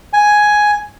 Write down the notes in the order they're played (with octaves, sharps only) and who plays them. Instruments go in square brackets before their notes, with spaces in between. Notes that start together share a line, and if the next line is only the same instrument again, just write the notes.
[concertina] G#5